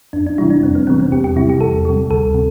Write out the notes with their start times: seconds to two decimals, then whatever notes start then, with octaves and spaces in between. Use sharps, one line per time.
0.13 F2 D4
0.26 D4
0.38 C3 E3 G3 E4
0.50 D4
0.63 F2 C4
0.75 B3
0.87 C3 E3 G3 C4
1.00 C4
1.12 E2 G4
1.24 G4
1.36 C3 G3 E4
1.49 G4
1.61 E2 A4
1.85 C3 G3
2.10 D2 A4
2.35 C3